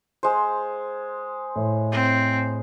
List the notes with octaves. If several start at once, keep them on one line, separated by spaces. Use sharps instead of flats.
G#3 C5
A2
C4